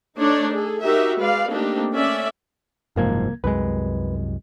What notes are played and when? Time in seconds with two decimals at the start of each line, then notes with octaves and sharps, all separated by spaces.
0.17 A3 D4 D#4 C#5 D5
0.52 G#4 A4
0.83 D#4 F#4 G4 A#4 E5
1.20 G#3 B4 D5 F5
1.49 A3 A#3 C4 D4 D#4 G4
1.92 A3 C#4 D5 E5
2.96 F#1 C2 G#2 F3 A#3 G#6
3.44 C2 F#2 G#3 B4